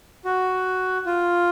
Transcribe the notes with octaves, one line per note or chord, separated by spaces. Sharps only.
F#4
F4